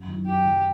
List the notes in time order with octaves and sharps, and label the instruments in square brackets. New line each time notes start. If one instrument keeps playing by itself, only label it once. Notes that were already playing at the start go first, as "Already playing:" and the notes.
Already playing: [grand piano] F#2
D#3 F#3
[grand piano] F#2 [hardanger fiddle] G4
[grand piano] D#3 F#3